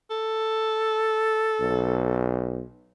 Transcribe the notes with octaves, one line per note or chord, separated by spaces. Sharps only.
A4
B1